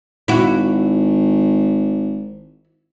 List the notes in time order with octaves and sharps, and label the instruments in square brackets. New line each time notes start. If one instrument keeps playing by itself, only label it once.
[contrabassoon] G#1 [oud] E4 F#4